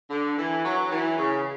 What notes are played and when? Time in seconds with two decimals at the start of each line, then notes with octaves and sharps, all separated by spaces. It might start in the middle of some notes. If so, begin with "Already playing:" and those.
0.10 D3
0.38 E3
0.65 F#3
0.91 E3
1.18 C#3